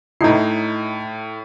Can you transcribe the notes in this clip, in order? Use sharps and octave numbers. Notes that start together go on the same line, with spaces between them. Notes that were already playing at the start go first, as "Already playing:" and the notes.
A2 D#4 E4 C7